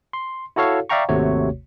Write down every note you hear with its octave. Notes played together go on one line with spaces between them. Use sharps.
C6
E4 F#4 A4 C#5 F5
D5 E5 F5 G5 A#5 C#6
G#1 D#2 C3 A3 F#4 C#5